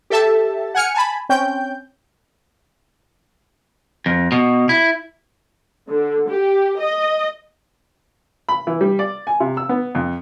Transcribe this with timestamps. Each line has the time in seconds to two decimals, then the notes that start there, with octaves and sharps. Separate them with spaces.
0.10 G4 A4 E5 A5
0.75 F#5 G#5 F6 C#7
0.95 G#5 A5 B5
1.29 C4 C#4 G5 G6
4.06 F2
4.32 B2
4.69 E4
5.90 D3
6.29 G4
6.79 D#5
8.49 B5
8.67 E3
8.81 G3
8.99 D5
9.27 G#5
9.40 C3
9.57 E6
9.69 B3
9.95 F2